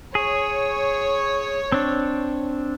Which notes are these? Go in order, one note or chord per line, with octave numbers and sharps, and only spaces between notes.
G#4 C#5
C4 D4